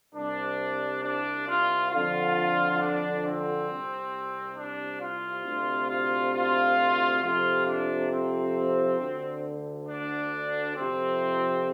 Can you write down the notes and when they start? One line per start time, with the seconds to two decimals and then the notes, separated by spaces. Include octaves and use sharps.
0.15 C2 C3 D4
1.04 D4
1.48 F4
1.92 F2 D3 F4
2.81 D4
3.24 C4
3.69 C2 C3
4.58 D4
5.01 F4
5.45 D2 C3
5.90 F4
6.34 F4
7.22 F2 C3 F4
7.67 D4
8.11 C4
8.99 D2 D3
9.88 D4
10.76 F2 C3 C4